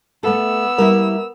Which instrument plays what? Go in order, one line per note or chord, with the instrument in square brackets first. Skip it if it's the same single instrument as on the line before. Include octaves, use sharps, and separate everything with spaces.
[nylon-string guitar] A3 A4 [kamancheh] B3 E6
[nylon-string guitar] G3 A#3 E4 [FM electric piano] A#4